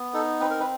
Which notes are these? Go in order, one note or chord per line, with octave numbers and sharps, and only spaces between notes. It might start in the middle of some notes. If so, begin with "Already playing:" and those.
Already playing: B3
D#4 A4
C4 B4
A#4
B4